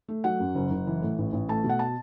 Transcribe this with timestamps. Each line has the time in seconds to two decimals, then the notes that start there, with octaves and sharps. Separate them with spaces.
0.08 A3
0.24 F#3 F#5
0.40 F#2
0.55 F#1
0.71 F#1
0.87 E3
1.02 A2
1.18 A1
1.33 A1
1.48 A3 A5
1.64 B2
1.69 F#5
1.79 A5